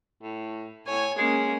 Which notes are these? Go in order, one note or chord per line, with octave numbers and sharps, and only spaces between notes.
A2
A2 C#5 G#5
G#3 A#3 C#4